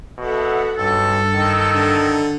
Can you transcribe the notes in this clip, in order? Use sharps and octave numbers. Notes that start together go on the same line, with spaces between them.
B2 A4 E5 F#5
B1 G2 A4
D#3
D3